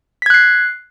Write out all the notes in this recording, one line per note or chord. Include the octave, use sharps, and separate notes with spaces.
F#6 G#6 B6 C7